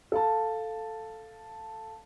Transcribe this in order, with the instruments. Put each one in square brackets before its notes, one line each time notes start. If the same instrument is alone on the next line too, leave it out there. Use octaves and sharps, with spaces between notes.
[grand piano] A4 F5 A5